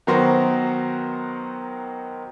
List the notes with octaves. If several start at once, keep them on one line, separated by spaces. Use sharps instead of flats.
D#3 F#3 B3 F#4 A#4 C5